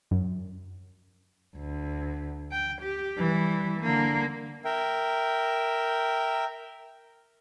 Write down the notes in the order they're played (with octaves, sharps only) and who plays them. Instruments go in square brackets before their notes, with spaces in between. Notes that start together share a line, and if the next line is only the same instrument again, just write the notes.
[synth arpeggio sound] F#2
[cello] D2
G5
G4
E3 G3
D3 A#3
[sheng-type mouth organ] A#4 E5 G5